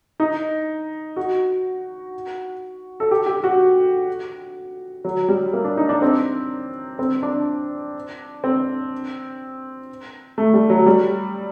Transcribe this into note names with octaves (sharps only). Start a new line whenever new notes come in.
D#4
F#4
A4
G4
G4
F#4
F#3
G3
A#3
D4
D#4
D4
C4
C4
D4
C4
A3
G3
F#3
G3